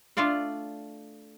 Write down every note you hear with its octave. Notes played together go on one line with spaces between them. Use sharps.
A3 D4 F4 D5 F5